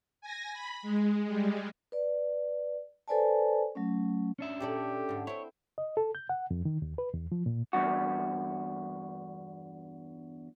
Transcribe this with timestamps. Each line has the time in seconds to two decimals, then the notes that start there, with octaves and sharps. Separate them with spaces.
0.21 G#5 A#6
0.54 B5
0.82 G#3
1.23 G3 G#3
1.92 B4 D5
3.08 A4 B4 C5 D5 G#5 A5
3.75 F#3 A3 C#4
4.39 C#4 D4 E5
4.60 A#2 G4 A4 D5
5.09 G#2 D3
5.27 C4 E4 C#5
5.78 D#5
5.97 A4
6.15 G6
6.29 F#5
6.51 F2
6.65 D#3
6.82 D#2
6.98 B4
7.14 E2
7.32 F3
7.46 A#2
7.73 E2 G2 F#4